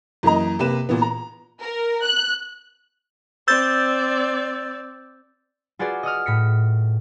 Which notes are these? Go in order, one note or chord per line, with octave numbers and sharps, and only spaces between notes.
F#2 E3 A#3 D#5 A#5
C3 A#3 B4 E7
A#2 E3 B3
A#5
A#4
F#6
C4 D5 E6 G6 A6
F4 F#4 G#4 B4 D5
D#5 F#5 D#6 F6
A2 B6 C#7